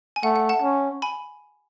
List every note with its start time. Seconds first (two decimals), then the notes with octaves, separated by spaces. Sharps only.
0.16 G#5
0.23 A3 F#5
0.36 F#5
0.49 F#5 A5
0.62 C#4
1.02 G#5 B5